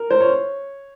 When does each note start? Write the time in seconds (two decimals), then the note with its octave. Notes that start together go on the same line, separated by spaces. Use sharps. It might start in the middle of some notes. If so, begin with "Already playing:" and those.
Already playing: A#4
0.10 C5
0.20 C#5